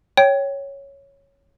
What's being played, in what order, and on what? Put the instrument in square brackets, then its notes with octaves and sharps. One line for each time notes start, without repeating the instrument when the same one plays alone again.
[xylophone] C#5 [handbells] G5